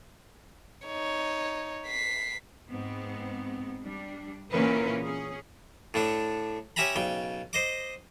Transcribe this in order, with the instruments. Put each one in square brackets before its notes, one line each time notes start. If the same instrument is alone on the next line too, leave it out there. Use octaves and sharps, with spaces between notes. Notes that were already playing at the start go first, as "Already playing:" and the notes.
[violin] D#4 C#5
B6 C7
[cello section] G#2 B3 C4
G3 D4
A#2 D3 E3 C#4 A#4 B4
C#4 G#4
[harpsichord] A2 A3 D4
C#4 G4 E5 G#5 A#5 B5
B1 C#3 G5
C5 D#5 D6